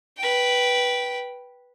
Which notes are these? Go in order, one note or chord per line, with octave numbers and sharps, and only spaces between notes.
B4 G5